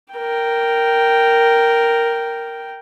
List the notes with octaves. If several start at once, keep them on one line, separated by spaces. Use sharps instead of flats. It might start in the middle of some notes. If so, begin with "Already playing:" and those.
A#4 G5